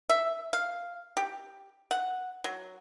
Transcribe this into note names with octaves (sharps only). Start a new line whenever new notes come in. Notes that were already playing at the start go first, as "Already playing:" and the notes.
E5
F5
G4
F#5
F#3